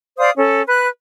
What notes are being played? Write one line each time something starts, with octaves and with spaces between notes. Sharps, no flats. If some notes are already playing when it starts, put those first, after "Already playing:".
C5 D5 F5 D#6
C#4 A4
B4 F#6